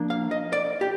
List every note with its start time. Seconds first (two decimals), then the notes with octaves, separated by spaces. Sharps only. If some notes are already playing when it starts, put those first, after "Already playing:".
Already playing: F3 A#3 D4
0.10 F5
0.31 D#5
0.53 D5
0.81 G4